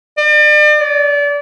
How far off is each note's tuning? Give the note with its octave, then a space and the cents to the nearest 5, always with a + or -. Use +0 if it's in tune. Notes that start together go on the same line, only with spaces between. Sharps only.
D5 +40
D5 -30